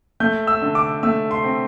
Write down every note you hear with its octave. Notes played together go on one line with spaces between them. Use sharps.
A3 G6
E6
D3
D6
A3 E6
C6
C4